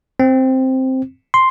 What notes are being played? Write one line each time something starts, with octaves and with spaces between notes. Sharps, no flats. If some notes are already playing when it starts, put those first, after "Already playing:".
C4
C6